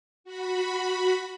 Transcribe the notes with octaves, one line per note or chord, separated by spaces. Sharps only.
F#4 B5